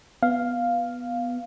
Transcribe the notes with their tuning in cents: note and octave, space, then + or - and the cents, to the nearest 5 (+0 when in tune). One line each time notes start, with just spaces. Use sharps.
B3 +0 F5 +0